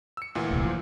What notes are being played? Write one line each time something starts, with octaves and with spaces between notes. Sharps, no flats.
E6 C#7
D2 A#2 E3
D#1 C2
F3